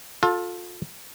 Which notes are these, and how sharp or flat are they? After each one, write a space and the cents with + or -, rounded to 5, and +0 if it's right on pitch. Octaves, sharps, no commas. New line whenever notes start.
F4 +25 A4 +0